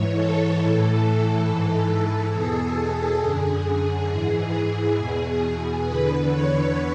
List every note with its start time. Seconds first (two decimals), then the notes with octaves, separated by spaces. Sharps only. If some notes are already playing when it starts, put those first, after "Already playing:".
Already playing: G#2 E3 C#5
0.14 A4
0.58 A2 E3
1.45 G#2 E3
2.33 E2 B2 G#4
3.22 F#2 D3
4.10 G#2 E3 G#4
4.97 E2 B2
5.85 E2 D3 B4
6.29 C#5